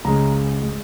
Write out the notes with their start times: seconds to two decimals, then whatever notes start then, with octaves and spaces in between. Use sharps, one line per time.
0.05 C#2 C#3 G#3 A#5
0.63 G#3